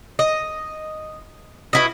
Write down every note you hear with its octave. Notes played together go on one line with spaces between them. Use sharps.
D#5
B2 E4 D#5